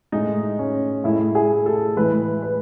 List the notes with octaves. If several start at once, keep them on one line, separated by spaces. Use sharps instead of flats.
A2 G#3 D#4
C#4
A2 G#3 E4
G#4
A4
A2 E3 G#3 B4
B4